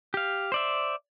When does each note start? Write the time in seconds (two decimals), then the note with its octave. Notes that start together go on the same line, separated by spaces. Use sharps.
0.14 G4 F5
0.52 C5 D5 E5